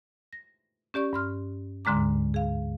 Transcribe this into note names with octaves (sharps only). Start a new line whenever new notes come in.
A#6
C#4 G4 D5 C#6
G2 C6 F6
D2 G#2 D3 G#3 A#5 D6
G#4 F5